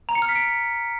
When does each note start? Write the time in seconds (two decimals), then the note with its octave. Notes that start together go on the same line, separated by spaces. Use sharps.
0.09 A#5
0.15 C#7
0.22 F6
0.29 B6
0.36 D7